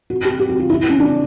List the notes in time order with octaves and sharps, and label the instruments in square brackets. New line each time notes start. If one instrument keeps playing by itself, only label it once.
[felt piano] F#4
G4
G4
F#4
F4
E4
C#4
D4